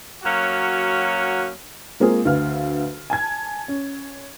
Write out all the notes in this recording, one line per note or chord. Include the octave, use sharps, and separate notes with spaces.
F#3 A#3 C#4 F#4
G#3 A#3 C4 F4 G#4 A#4
D2 B4 F5 F6
G#5 A5 G#6
C#4